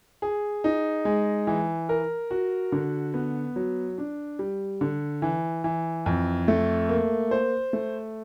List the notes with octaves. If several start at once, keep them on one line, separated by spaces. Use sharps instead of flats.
G#4
D#4
G#3
E3
A#4
F#4
D3
B3
F#3
D4
G3
D3
E3
E3
F2
A3
A#3
C5
A3